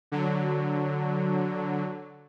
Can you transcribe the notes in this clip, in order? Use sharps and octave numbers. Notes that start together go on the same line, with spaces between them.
D3 F#3